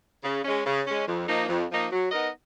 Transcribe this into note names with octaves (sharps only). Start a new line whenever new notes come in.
C#3
G#3 C#4
C#3
G#3 C#4
F2
F3 A#3 D#4
F2
F3 A#3 D#4
F#3
B3 D#4 A#4 D#5